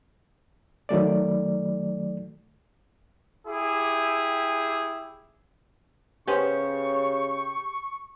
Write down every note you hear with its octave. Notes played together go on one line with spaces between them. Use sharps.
D#3 F#3 A3 D5
E4 G4 G#4
C#3 B3 C#4 G4 C5 C#6